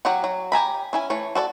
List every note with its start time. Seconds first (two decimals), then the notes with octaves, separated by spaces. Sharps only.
0.05 F#3 F#4 G4 C#5 F#5
0.24 F#3
0.52 G4 G#5 A#5 B5
0.93 C#4 E4 G#5
1.10 E3 A3 C#5
1.35 F#4 A4 C#5 D5